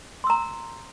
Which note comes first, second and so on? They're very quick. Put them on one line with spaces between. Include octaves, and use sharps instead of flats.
C6 E6 A#5